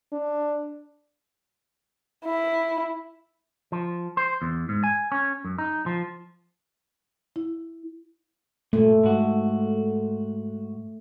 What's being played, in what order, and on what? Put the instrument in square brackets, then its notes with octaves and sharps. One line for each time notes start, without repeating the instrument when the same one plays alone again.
[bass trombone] D4
[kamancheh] E4
[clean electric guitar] F3
C5
E2
G#2
G#5
C#4
F#2
D#4
F3
[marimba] E4
[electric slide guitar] G2 A#2 [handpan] A3
[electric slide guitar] G#2 F#4